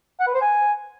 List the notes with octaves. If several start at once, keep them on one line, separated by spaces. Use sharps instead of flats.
F#5
B4
C5
G#5